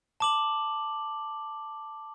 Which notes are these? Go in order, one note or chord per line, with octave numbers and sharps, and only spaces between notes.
A5 D6 F#7